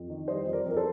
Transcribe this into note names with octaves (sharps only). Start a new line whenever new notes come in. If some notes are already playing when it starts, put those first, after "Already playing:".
Already playing: F2
D#3
G3 C5 D#5
F2
A#4 D5
F2
A#4
A4 C5